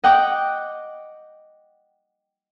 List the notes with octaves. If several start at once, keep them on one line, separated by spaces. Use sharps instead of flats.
D#5 F#5 G5 D6